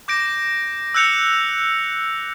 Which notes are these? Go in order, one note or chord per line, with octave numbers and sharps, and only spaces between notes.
D6 G6 A#6 D7
E6 F#6 G6 C#7 F7